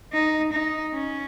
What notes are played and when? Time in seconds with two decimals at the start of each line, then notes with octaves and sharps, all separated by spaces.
0.13 D#4
0.53 D#4
0.94 C#4